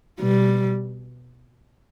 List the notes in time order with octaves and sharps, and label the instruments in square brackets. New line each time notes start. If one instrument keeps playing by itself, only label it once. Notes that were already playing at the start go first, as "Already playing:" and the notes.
[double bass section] B2 [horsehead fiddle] G3